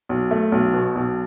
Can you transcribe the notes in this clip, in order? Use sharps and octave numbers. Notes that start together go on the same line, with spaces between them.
B1
A3
B1
B2
B1